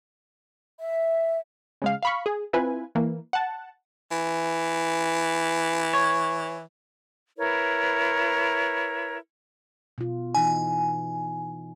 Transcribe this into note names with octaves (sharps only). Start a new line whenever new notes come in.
E5
C#3 G#3 F5
F5 B5 C#6
G#4
C4 E4 F4 B4 G#5
E3 A#3
F#5 A5
E3
C#5
E4 A#4 B4 C#5
B2 F4
E3 D#4 G#5